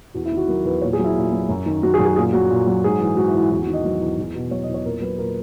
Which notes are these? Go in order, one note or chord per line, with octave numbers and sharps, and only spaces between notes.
E2 F#4
E4
D#3
F#4
F#3 A#4
E2 B4
A#2 C#5
G#4
F#3
E4
A#2
F#3
F#2
D#3
F#3 F#4
G#4
F#2
G#4
A#2 G#4
F#3 F#4
A#2
F#3
G#2 G#4
E3
G#2 F#4
E4
E3
E4
E2 F#4
F#4
D#3
D#5
F#3
E2
E2
B2
F#3 C#5
D#5
E2
C#5
A#2 A#4
F#3 B4
A#2 A#4